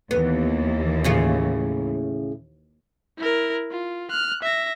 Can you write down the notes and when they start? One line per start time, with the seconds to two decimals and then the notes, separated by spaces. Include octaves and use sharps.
0.11 D#2 E3 B3
1.04 A2 C#3 F4
3.18 E4 A#4
3.71 F4
4.10 F6 F#6
4.43 E5 A#6